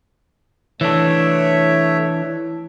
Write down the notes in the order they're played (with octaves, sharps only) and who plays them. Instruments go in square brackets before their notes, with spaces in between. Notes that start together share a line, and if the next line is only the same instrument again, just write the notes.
[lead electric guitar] E3 D4 [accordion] A3 C#5 E5